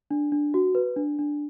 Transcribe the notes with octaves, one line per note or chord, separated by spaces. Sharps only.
D4
D4
F#4
B4
D4
D4